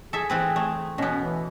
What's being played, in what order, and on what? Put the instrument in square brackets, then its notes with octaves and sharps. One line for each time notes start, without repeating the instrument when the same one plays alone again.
[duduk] G#4 [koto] A4 E5
[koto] E3 C4 B4
A3
[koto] B2 B3 [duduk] C#4
[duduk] E3